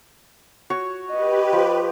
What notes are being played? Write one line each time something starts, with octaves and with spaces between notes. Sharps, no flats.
F#4 C#5 C#6
G4 B4 D#5
F3